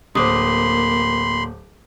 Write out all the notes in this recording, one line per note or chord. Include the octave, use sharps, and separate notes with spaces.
D1 A#3 C5 B5 C6 D6 D#6